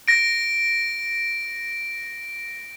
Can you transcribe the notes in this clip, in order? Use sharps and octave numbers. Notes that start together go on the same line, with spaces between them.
A#6 D7